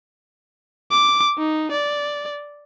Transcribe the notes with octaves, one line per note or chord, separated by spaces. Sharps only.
D6
D#4
D5